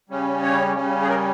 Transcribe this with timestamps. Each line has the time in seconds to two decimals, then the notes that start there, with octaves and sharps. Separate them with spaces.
0.09 C#3 G3 C#4
0.43 C#5
0.76 C#3 G3 C#4
1.02 G#4
1.09 A#4